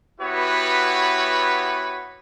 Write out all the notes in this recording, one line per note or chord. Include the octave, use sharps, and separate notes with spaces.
B3 E4 F#4 G4 B4 C#5